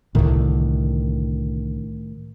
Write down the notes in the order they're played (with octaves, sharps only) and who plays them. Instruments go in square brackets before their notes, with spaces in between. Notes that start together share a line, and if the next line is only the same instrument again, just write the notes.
[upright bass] C2 D3 [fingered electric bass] A2 D#3